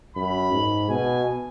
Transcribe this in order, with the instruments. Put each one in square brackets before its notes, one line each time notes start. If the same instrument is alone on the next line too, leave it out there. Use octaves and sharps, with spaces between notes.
[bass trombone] F#2 [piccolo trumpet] B5
[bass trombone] G#2
[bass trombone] B2 [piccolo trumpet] G#5